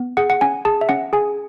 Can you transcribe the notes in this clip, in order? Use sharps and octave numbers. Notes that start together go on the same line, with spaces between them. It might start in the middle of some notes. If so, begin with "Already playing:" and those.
Already playing: B3
G#4 F#5
F#5
C#4 G#5
G#4 A5
E5
C#4 F#5
G#4 G#5